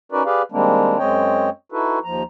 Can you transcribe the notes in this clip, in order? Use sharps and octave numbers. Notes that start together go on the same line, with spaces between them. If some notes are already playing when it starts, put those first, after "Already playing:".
C#4 D#4 F#4 A#4 B4 D5
G4 G#4 B4 D5 F5
D#3 G3 G#3 A#3 C4 D4
F#2 G#3 C4 C#5 D#5 G5
D#4 E4 F#4 A4 B4
D#2 F3 A#5